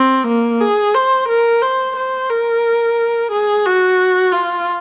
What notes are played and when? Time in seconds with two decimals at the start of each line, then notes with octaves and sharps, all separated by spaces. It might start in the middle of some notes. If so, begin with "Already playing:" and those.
Already playing: C4
0.27 A#3
0.61 G#4
0.95 C5
1.28 A#4
1.62 C5
1.96 C5
2.30 A#4
3.31 G#4
3.65 F#4
4.32 F4